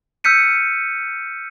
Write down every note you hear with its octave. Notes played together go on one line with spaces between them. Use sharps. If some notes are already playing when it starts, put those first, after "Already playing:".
E6 F6 G6 B6 C#7 D#7